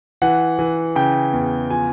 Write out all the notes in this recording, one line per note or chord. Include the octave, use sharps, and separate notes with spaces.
E3 F#5
E3
C#3 G5
E2
F3 G#5